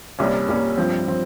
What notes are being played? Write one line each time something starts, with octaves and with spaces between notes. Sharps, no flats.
C2 C3 G3 A#3 C#4
C2 C3 G3 A#3 C#4
G2 F3 C4
F3 C4